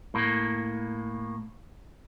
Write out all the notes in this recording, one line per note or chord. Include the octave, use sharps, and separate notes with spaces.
A2 A#3